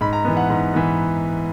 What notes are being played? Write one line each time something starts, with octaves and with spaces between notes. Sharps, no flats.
G#2 B5
A#5
E3 B3
F#5
G#2
E3 B3